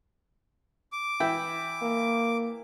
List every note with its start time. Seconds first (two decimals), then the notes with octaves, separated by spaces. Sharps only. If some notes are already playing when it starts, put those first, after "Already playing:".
0.92 D6
1.20 E3 E4 G5
1.82 A#3